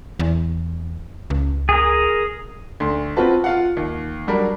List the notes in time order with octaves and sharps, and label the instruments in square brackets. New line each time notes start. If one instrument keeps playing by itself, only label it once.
[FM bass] E2
C#2
[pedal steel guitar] G#4 A#4
[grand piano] D2 C6
C4 F4 F#4 B4 A5
F4 F5 F#5
D#2
F#3 G3 D4 A#4